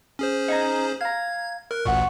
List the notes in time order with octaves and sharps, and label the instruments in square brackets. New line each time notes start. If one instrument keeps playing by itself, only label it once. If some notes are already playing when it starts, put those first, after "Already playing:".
[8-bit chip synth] C#4 G#4 C5
[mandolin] D#4 G#5 A#5
[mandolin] F5 A#5 [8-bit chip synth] G#6
[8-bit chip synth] A#4 [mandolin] F#6
[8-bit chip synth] A1 D2 A#2 [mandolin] F#5 C#6